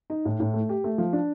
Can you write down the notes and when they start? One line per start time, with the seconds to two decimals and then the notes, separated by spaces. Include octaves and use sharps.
0.10 D#4
0.25 A2
0.40 A2
0.54 A3
0.69 G4
0.84 A3
0.98 F3
1.13 D4